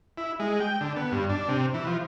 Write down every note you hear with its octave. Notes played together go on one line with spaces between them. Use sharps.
E4
G#3
G5
D3
B3
G2
D4
C3
E3
F3